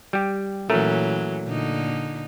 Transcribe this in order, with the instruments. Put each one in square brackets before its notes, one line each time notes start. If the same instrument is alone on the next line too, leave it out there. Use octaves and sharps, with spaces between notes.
[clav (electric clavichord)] G3 G4
[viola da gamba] A#2 E3 F#3 [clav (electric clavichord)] A3 C#4 A#4
[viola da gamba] A#2 D3 D#4